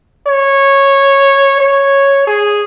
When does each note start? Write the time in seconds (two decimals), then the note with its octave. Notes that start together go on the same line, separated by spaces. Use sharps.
0.27 C#5
1.60 C#5
2.27 G#4